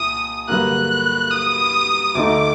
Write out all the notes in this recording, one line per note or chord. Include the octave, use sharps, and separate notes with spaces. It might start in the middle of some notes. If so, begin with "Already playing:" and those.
Already playing: C2 A#2 D#6
G2 D3 F#3 A#3 F#6
D#6
D2 D3 A3 D#4 D6